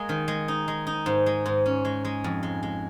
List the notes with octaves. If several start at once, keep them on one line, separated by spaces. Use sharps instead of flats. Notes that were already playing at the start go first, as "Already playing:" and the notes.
Already playing: G#3 A#3 G#4
D#3
G#3
D#4
G#3
D#4
G#2
G#3
G#2
C#4
G#3
G#3
F2
G#3
G#3